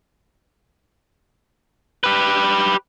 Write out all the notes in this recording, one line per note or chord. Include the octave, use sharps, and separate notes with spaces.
G4 B4